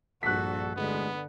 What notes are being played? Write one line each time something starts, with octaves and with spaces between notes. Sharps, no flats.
A#1 G2 F#4 A4 F#6 B6
A1 D2 D3 G#3 B3